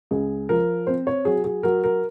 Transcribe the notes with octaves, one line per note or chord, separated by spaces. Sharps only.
C#2 G#4
F3 A#4
C4 C5
C#5
F#3 G#4
G#4
F#3 A#4
A#4